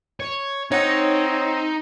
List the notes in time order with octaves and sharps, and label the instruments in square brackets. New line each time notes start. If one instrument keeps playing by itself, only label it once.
[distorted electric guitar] C#5
[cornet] C4 [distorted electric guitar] D#4 [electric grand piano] C#5 F#5